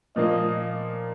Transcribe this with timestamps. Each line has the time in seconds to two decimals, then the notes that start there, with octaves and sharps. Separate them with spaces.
0.16 A#2 F3 A#3 D#5